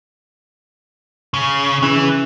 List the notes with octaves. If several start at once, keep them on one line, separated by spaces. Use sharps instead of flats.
C#3
C#3 E3